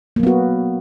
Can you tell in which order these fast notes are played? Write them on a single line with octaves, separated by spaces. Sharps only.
A#3 F#3 B3 F#4